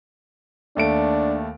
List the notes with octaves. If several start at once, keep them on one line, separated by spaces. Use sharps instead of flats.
D#2 A3 D4 D7